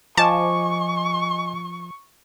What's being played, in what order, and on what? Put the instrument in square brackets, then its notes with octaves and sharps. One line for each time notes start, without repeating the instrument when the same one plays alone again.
[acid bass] F3 [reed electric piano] D#5 G#5 D6 [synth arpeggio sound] A5 [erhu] C#6